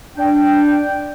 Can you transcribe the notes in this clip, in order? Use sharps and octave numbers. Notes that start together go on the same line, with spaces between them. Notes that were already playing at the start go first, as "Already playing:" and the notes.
D4 G5